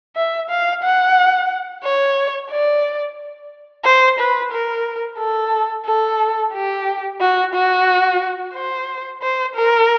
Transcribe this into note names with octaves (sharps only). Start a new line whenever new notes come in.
E5
F5
F#5
C#5
D5
C5
B4
A#4
A4
A4
G4
F#4
F#4
C5
C5
A#4